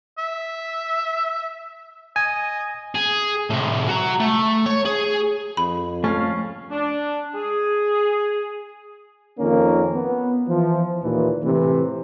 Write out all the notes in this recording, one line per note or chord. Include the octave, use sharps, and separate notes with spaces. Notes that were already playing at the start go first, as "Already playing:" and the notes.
E5
D#5 G#5
G#4
A2 C3
F#4 A#5
A3
C#5
G#4
F2 B5
A3 C#4 F5
D4
G#4
F2 D#3 A#3 C#4
B3
E3 F3
D#2 A#2 E3
A2 C3 E3